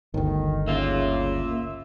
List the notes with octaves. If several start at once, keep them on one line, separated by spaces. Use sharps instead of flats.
G1 D2 D#3
C#3 A#3 F4 E5